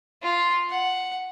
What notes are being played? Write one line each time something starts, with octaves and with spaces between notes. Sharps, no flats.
F4
F#5